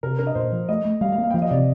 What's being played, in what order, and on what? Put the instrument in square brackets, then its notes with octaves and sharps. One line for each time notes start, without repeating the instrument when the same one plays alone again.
[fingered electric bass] C3 [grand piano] A#4
[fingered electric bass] D4 [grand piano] A#4
[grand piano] D#5
[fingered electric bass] A#2 [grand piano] C5
[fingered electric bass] F3
[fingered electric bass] A3 [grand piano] D#5
[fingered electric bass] A3
[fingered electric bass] G3 [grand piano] F5
[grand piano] F5
[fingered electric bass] A#3
[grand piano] F5
G5
[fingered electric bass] F3 [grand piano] F5
[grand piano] D#5
[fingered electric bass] C3 [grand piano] D5